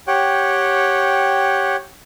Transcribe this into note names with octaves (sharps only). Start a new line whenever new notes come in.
G4 C#5 F#5 G5